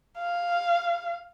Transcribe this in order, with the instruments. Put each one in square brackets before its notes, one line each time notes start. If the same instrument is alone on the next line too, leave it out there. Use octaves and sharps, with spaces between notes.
[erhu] F5